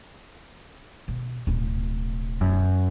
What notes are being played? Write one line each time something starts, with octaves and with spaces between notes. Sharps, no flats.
B2
D1 B2
F#2